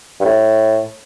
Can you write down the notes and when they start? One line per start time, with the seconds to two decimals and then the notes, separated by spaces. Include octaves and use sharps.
0.20 G2
0.25 A2